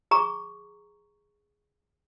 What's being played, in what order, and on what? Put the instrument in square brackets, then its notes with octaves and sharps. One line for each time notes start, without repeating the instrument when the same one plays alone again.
[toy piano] G#4 A#5 C#6